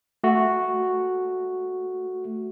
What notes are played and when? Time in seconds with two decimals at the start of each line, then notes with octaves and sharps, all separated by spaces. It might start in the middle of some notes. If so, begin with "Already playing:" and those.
0.24 A3 F#4